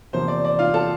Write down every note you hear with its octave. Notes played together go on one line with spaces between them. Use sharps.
E2 C3 F3 A#3 C5
D5
D5
F4 F5
A4 A5